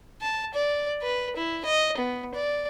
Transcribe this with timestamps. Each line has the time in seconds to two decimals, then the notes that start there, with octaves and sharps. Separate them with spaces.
0.22 A5
0.54 D5
1.02 B4
1.36 E4
1.65 D#5
1.98 B3
2.35 D5